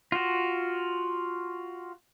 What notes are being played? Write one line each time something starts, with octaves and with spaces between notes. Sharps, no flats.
F4 F#4